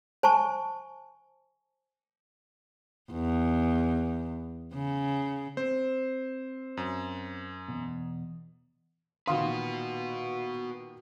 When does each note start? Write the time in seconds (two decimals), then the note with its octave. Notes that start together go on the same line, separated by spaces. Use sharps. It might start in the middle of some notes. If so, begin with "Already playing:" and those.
0.23 C5 G#5 A5 C#6
3.12 E2
4.74 C#3
5.57 C4 C5
6.77 F#2
7.68 E2 G#2 B2
9.28 A#2 D#3 F#4 B4 F5 C6 D#6